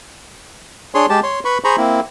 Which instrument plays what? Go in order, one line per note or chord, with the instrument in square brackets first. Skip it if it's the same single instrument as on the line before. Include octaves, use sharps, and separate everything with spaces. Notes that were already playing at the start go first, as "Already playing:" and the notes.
[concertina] D4 G#4 C#5 C6
G#3 G4 A5
C#5 C6
B4 B5 C#6
G#4 C5 A#5 B5 C#6
A#3 C4 E4